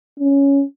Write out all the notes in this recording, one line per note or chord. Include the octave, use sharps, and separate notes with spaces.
C#4